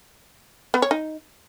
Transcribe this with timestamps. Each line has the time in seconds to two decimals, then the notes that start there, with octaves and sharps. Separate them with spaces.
0.74 B3
0.82 C#5
0.91 D#4